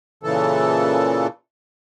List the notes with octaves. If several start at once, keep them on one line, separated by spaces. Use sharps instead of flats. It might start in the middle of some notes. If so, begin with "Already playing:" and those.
A#2 C#3 E3 A4